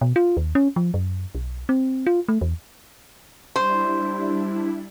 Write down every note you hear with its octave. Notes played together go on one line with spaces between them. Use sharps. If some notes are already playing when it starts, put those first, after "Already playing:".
B2
F4
D#2
C#4
F3
F#2
B1
C4
F4
A3
E2
G3 D4 E4 C5